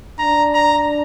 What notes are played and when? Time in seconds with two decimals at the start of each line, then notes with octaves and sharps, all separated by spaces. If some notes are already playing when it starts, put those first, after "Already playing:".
0.19 D4 A#5
0.54 A#5